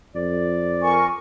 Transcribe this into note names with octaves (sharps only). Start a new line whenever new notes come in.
F2 D5
A#4 G#5 C#6